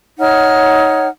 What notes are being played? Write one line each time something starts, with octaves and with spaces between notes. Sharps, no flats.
D#4 C#5 F#5 F6